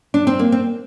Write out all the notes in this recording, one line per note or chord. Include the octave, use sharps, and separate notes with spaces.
D4
C4
A#3
C4